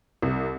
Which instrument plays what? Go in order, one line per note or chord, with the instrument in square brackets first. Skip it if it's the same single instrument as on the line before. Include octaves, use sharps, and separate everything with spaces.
[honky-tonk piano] C2